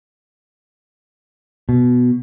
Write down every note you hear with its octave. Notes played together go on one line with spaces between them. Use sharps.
B2